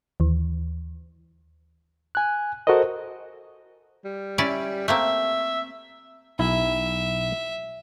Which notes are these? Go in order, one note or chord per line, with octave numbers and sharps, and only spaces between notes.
D#2 E3
G#5 F#6
F#4 A4 A#4 C5 D#5
G3
C#4 E4 D5
A3 A#3 C4 E5
B1 E4 E5